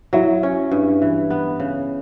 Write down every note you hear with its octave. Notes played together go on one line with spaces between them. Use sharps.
F#3 E4
C#4
G2
E3
B3
C#3